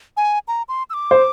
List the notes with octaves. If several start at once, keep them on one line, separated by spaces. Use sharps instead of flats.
G#5
A#5
C6
E6
D6
C5